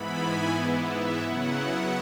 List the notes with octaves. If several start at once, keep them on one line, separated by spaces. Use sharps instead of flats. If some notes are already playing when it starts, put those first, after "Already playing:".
Already playing: G#2 E3 B3 E4 B5
G#5
G#2 E3 B3 E4
E5
C#3 F#3 B3 E4 F#5